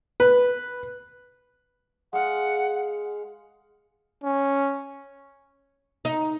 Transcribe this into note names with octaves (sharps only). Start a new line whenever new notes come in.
B4
G#3 F5 F#5
C#4
D#4